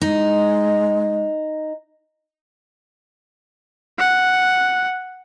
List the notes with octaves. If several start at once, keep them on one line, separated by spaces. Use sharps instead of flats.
G#3 D#4
F#5